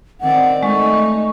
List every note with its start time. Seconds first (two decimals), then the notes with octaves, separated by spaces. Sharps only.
0.21 D#3 C4 D5 F#5
0.63 G#3 A3 D#4 C#6